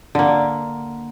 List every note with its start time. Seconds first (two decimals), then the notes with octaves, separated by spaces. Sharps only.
0.15 D3 A#3